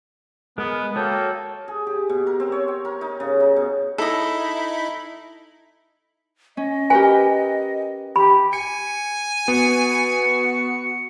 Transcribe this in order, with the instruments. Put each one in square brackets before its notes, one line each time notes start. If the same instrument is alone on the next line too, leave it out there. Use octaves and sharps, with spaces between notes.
[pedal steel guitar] G#3 A#4 [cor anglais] B3
[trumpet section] A#3 A4 [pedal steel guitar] F#4 C#5 D#6 [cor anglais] G5
[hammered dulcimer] G#4
G4
B2
A#4
C4
C#5
G5
A#4
D#4
C#3
D#4
B2
[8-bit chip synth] D#4 E4 B5 [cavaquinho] A4 D#5
[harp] C#4 [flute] D#5
[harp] G4 A#4 B4 [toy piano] G#5
[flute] G4 [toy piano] B5
[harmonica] G#5 [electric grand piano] C#7
[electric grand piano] B3 [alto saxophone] F#4 [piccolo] C#7